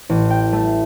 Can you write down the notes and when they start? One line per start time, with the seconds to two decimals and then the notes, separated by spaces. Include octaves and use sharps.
0.09 A1
0.30 G5
0.53 A3